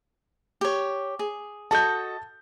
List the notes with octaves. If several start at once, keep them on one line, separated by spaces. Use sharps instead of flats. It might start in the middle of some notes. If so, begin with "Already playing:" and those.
G4 C#5
G#4
F#4 A4 D#5 A5 G6